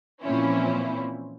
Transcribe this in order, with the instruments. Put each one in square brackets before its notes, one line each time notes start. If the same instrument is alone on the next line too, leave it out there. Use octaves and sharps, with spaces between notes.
[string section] A#2 E3 F3 C4 C#4 E4